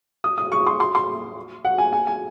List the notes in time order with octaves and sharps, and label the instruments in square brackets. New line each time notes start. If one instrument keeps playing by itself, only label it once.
[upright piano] D#6
D#6
C#6
C6
C6
C6
F#5
G#5
G#5
G#5